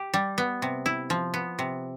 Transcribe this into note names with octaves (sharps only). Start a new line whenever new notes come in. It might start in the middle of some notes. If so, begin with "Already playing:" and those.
Already playing: G4
G3
B3
C3
E4
F3
B3
C3